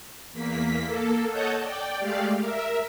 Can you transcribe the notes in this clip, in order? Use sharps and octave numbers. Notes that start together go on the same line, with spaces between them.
E2 A#3 B6
A#3 A4
A4 C#5 D#5 F#5 A5 G6
D5 G5
G#3 A3 G4 D5 F5
A#4 E5